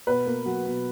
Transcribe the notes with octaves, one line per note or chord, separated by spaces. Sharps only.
B2 B4
A#3
F#3
B2